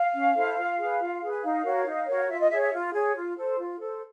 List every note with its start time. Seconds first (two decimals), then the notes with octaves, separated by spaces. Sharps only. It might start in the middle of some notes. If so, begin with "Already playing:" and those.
Already playing: F5
0.14 C#4
0.35 E4 A4 C5
0.57 F4
0.78 G#4 B4
0.99 F4
1.21 G#4 B4
1.43 D#4 F5
1.64 F#4 A#4 C#5
1.86 D#4
2.07 F#4 A#4 C#5
2.29 F4 E5
2.40 D#5
2.50 G#4 C#5 E5
2.61 E5
2.71 F4
2.93 G#4 C#5
3.15 F4
3.37 A4 C5
3.58 F4
3.79 A4 C5